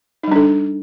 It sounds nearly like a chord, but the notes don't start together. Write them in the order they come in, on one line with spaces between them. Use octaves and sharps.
D#4 G3 D4 A4